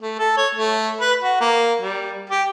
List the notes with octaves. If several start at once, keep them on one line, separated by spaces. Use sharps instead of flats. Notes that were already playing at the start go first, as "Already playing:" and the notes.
A3
A4
C#5
A3
B4
F#4
A#3
G3
G4